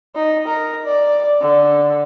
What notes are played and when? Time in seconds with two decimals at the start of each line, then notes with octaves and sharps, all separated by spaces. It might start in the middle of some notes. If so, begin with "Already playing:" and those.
0.15 D#4
0.47 A#4
0.86 D5
1.42 D3